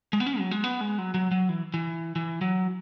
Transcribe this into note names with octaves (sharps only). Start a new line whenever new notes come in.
G#3
B3
C#4
F#3
G#3
B3
G#3
F#3
F#3
F#3
E3
E3
E3
F#3